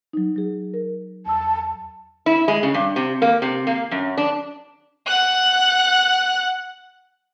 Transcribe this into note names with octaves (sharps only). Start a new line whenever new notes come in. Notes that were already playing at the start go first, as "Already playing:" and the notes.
F#3 D#4
F#3 G#4
A#4
E2 A5 E6
E4
G#3
C#3
G2
C3
A#3
C3
A#3
F#2
D4
F#5 F#6